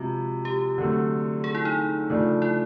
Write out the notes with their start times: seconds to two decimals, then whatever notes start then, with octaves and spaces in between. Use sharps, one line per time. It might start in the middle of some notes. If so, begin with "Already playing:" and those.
Already playing: C3 F3 G#3 F#4
0.45 G4
0.78 D3 F#3 A3 C4
1.44 G#4
1.55 E4
1.65 D#4
2.10 C#3 F3 A3 D4
2.42 E4